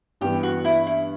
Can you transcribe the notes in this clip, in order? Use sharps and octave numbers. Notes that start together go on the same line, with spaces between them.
G2 E3 B3 G4
F#4
E4
E4